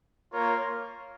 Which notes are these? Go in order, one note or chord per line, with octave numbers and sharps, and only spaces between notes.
A#3 F4 A#4 C#5